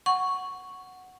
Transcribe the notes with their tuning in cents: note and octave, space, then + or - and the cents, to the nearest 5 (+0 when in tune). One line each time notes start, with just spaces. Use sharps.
F#5 +0 C#6 +0